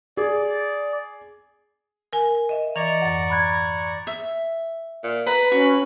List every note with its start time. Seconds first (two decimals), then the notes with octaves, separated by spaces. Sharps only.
0.17 G#4 D5
2.13 A#4 G#5
2.49 D#5 E5
2.76 E3 D5 D#5 A#5 C#6 F7
3.02 F2 G#2 F#5 A6
3.30 B5 F#6 G#6
4.07 E5
5.03 A#2
5.26 B4 A#5
5.52 C#4 F#4